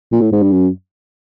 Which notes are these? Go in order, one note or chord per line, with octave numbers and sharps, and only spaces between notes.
A#2
A2
G#2
G2
F#2